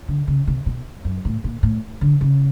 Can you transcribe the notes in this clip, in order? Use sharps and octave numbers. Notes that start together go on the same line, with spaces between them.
D3
C#3
C3
B2
F#2
A2
A#2
A2
D3
C#3